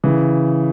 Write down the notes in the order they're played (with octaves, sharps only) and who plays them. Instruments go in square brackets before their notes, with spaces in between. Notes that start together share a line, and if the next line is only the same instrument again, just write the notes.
[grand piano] C#3 E3